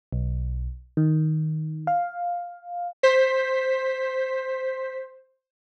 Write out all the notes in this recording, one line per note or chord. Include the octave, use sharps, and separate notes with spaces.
B1
D#3
F5
C5 B6